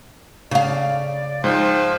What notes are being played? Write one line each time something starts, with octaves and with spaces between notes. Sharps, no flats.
C#3 D5 F5
G#2 F3 G5